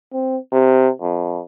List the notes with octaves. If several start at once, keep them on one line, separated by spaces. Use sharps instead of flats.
C4
C3
F2